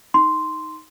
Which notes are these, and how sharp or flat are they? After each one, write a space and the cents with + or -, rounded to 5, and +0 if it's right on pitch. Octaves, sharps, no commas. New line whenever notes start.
D#4 +10 C6 -5